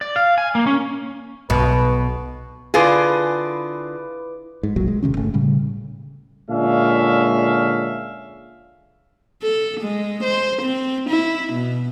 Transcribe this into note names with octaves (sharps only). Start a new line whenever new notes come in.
D5
F5
G#5
A#3
C#4
B1 B2 B4
D3 E4 F4 G#4 B4 D6
G#2
F1 B1 A#2 F#3
G#3
D#1 C3 D#3 C#4
G1 A3 C#4
A2 C#3 G3
A#2 D3 G#3 C#4 E5 F5
A4
G#3
C5
C4
E4
B2